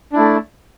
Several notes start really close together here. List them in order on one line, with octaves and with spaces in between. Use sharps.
D4 E4 A3